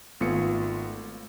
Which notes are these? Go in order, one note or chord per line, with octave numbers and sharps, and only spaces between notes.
G#1 A3 B3 F4 C#7